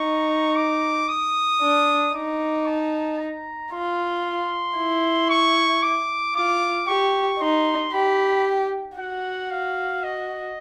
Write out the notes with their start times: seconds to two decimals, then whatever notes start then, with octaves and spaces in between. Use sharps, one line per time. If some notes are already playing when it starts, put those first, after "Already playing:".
Already playing: D#4 C#6
0.56 D6
1.08 D#6
1.61 D4
2.14 D#4 D6
2.66 A5
3.19 A#5
3.72 F4 C6
4.77 E4
5.29 C#6
5.83 D6
6.36 F4 D6
6.88 G4 C#6
7.40 D#4 C6
7.93 G4 B5
8.98 F#4 F#5
9.51 F5
10.03 D#5